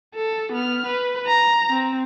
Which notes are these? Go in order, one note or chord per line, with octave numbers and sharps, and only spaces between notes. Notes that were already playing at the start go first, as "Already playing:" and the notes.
A4
B3 F6
B4
A#5
C4